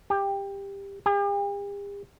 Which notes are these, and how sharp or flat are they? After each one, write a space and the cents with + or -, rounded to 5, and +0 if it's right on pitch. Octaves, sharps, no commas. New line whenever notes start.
G4 +15
G4 +45